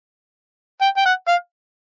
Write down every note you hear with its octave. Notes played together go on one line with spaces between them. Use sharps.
G5
G5
F#5
F5